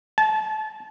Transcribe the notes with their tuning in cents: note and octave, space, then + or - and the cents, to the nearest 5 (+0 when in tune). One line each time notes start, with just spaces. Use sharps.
A5 -30